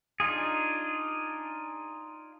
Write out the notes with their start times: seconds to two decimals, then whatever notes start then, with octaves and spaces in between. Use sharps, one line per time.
0.20 D4 D#4 F4 G#4